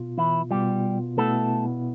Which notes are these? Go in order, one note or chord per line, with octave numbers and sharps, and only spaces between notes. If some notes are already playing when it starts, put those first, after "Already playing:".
Already playing: B2 B3 F4
E3 E4
B2 G3 B3 F4 G4
B2 A3 B3 E4 A4